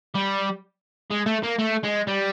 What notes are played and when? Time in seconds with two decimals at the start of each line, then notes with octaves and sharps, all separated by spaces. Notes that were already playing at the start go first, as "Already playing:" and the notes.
0.15 G3
1.11 G#3
1.26 A3
1.43 A#3
1.59 A3
1.83 G#3
2.07 G3